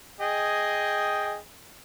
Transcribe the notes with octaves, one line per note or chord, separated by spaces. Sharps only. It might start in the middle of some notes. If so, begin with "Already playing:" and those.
G#4 D#5 G5